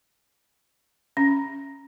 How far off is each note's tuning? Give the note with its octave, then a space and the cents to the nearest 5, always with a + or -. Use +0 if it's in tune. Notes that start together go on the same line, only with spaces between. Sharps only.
C#4 +0 A#5 +0